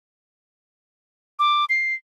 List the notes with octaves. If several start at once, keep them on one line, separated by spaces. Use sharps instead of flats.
D6
C7